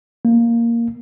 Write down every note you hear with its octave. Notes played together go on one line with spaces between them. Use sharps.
A#3